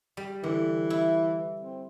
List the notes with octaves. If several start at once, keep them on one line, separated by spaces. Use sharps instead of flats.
G3
D3 E3
E4
C4